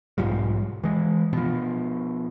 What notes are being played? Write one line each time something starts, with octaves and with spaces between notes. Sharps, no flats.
B1 G#2 F3 G3
E3 G#3
B2 F3